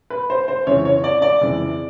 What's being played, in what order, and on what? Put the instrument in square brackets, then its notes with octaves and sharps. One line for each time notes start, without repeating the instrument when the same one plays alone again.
[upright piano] B4
C5
C5
F2 C#3 E3 G#3 C#5
C#5
D5
D5
F2 C#3 E3 G#3